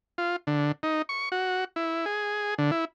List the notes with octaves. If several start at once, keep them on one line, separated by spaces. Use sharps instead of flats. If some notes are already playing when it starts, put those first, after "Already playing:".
F4
D3
D#4
C#6
F#4
E4
G#4
D3
E4